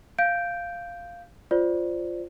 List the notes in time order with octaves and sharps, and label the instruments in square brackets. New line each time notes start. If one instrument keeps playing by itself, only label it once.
[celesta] F5 G6 D7
F4 C5 D5